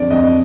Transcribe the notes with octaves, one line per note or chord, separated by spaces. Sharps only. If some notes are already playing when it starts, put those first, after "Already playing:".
Already playing: F2 D3 D5
F2 D#5